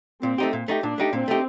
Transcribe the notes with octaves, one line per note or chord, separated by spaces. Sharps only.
A#2 C4
A3 D#4 G4
A#2
A3 D#4 G4
A#2 D4
A3 D#4 G4
A#2 C4
A3 D#4 G4